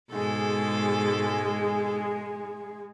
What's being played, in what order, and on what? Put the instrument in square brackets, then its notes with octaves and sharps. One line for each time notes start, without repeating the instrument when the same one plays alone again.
[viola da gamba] G#2 B2 A4 [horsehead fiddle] G#3 G#4